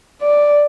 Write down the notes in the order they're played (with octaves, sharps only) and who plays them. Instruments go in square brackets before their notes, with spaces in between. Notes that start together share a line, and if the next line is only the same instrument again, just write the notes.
[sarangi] D5